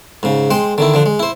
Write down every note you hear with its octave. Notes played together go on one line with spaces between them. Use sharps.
G#2 C#3
G#3 C5 G5
D3 D#3 E4
D3 F3 D4
G#3
E4 C5